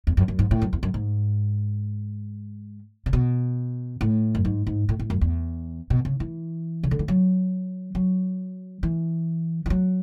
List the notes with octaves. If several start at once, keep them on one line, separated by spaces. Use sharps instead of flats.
E2
F#2
F#2
G#2
A2
F#2
E2
F#2
G#2
C#3
B2
A2
F#2
G#2
G#2
A2
A2
F#2
E2
B2
C#3
E3
C#3
D3
E3
F#3
F#3
E3
E3
F#3